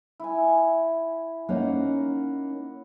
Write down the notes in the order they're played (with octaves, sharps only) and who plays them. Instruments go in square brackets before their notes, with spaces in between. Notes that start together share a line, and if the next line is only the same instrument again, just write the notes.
[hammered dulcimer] E4 G#5
[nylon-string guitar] A#3 C#4 D#4 [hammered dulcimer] F#5